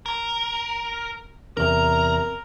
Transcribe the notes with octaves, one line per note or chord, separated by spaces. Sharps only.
A#4
E2 C3 A#4 A#5